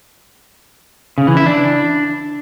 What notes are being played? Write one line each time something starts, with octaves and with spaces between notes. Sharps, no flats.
C#3
E3
E4
D4